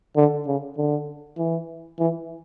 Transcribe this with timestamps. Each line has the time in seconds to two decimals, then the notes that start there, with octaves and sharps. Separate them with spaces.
0.16 D3
0.47 C#3
0.77 D3
1.38 E3
1.99 E3